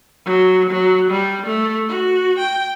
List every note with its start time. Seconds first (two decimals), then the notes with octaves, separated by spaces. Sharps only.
0.26 F#3
0.70 F#3
1.11 G3
1.46 A3
1.88 F#4
2.39 G5